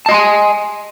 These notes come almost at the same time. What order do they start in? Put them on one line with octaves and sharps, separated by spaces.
A5 D#5 C6 G#5